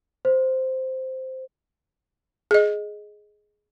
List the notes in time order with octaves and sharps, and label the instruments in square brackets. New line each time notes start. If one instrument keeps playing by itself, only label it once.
[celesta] C5
[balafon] G#4 D#5